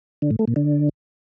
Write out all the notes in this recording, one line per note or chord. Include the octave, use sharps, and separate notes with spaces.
D3
A2
A3
A#2
D3